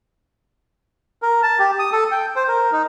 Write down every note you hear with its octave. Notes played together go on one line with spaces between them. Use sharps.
A#4
A5
G4
D#6
A4
G5
C5
A#4
D#4